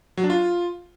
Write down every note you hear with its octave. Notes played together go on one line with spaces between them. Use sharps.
F#3
D4
F4